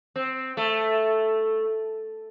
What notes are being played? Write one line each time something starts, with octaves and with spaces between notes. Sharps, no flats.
C4
A3